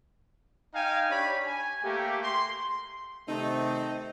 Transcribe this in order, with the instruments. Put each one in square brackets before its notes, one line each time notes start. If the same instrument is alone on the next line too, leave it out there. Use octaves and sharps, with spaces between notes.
[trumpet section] D#4 F5 G5 G#5
D4 G4 C#5 B5
G#5
A3 A#3 G4
C6
[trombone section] C3 D#3 A3 [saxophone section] C4 D#4